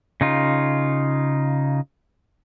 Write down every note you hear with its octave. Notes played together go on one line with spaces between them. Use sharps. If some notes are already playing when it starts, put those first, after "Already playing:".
C#3 D#4 F4